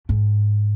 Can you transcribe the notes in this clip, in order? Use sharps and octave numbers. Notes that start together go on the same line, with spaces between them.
G#2